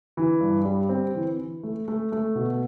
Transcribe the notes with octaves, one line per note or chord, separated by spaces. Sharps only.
E3
G2
G3
C4
E3
E3
A3
A3
A3
B2